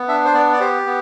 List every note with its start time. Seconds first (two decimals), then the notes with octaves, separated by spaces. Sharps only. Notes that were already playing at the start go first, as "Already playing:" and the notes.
Already playing: B3
0.08 D4 E5
0.25 C5
0.34 B3 D5
0.53 D5
0.60 G4 C5
0.86 B3